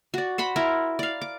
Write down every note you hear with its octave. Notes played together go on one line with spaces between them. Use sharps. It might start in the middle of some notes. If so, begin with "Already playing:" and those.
F#4 D5
C5 F#5 B5
E4 A#4
D5 F5
D6